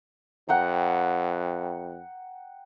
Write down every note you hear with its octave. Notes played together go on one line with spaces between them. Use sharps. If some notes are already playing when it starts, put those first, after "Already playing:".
F2 F#5 G5 A#5